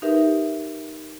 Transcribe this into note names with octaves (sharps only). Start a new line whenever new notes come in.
D#4 G4 A#4 B4 E5